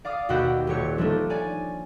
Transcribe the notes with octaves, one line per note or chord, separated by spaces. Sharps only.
D5 F5 D6 D#6
D#2 B2 F#4 G4 F#5 E6
D#1 A#2 G4 C#5 C#7
F3 G3 A3 A#3 D4 D#4
C#5 D5 G#5